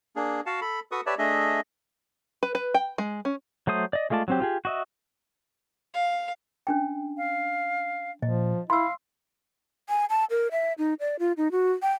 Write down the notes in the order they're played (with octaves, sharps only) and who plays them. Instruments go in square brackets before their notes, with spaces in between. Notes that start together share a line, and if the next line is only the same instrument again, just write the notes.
[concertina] A#3 D4 G#4
F#4 F5 F#5 A5
A4 B5
F#4 A4 B4 C#6 D#6
G4 B4 C#5 D5 E5 A5
A3 D4 G#4 D#5 E5
[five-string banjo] B4
B4
G5
G#3
C#4
[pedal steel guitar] F#3 A3 C5 D#6
D5 D#5
G#3 A3 F4 D5 A5
F#3 C4 G4
F4 G4 G#4
F#4 D#5 E5
[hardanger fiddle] F5
[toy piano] C#4 D4 G5
[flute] F5
[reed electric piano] A#2 [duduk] F3 [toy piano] D#5
[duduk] E4 [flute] F5 [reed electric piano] B5 [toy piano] C6 E6
[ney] G#5
A5
A#4
E5
D#4
D5
F4
D#4
F#4
G5